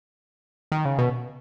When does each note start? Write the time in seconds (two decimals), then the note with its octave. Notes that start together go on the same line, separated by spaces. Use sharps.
0.72 D#3
0.85 C#3
0.98 B2